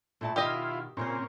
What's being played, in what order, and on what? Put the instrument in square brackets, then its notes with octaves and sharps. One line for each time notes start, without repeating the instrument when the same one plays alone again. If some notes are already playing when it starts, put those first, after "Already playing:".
[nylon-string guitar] A#2 E4 A5 [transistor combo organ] A3
[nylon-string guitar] B2 D#3 [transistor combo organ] E4 F4 [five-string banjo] G4 D#5
[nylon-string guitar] A#2 C#3 C5 [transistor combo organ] A#3 C4 C#4